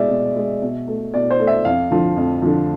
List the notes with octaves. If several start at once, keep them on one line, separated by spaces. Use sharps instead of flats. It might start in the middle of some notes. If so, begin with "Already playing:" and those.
Already playing: B2 G#3 D5 E5
B2
G#3
B2
A3
B2 D5
C5
A3
E5
F2 F5
D3 F3
F2
D3 F3